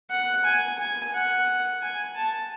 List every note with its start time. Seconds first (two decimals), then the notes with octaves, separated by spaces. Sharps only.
0.10 F#5
0.44 G#5
0.78 G#5
1.14 F#5
1.82 G#5
2.16 A5